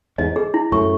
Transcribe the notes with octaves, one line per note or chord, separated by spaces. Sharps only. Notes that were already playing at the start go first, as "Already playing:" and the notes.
E2 G#2 D#5
G#4
E4
F#2 A2 C#6